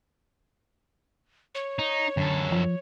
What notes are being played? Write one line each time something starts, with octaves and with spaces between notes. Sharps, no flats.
C#5
D#4
F#2 D3 A4
F3